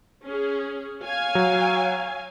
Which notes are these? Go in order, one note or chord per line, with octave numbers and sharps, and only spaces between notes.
C#4 G#4
C#5 F5 G#5
F#3